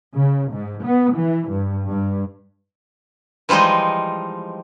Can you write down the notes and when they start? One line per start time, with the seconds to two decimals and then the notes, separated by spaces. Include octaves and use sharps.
0.14 C#3
0.51 G#2
0.84 B3
1.15 E3
1.50 G2
1.89 G2
3.49 E3 F3 G3 G#3 D#4